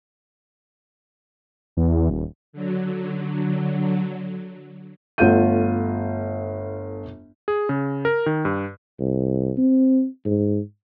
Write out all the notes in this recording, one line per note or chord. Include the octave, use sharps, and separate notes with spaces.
E2
E2
D#1
D3 F#3
G1 A3 F4 F#5 G6 D#7
G#4
C#3
A#4
D#3
G2
C2
C4
G#2